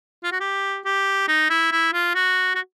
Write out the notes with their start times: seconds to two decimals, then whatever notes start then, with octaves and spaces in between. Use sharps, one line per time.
0.24 F4
0.32 F#4
0.41 G4
0.85 G4
1.28 D#4
1.50 E4
1.72 E4
1.93 F4
2.15 F#4
2.55 F#4